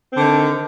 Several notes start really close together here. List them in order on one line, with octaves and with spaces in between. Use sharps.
C4 D3 D#3